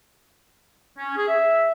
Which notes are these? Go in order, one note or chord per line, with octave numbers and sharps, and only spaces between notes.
C#4
G#4
E5